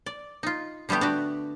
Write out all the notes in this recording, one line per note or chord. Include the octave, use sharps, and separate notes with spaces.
D5
D#4 F4
D3 G3 A3 B3 G4
D4 F#4 G4